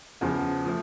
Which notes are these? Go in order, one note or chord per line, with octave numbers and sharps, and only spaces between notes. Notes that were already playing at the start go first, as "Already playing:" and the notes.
E2 C#3 F3
F3 A3